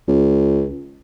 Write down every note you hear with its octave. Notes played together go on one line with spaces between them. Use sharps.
C#2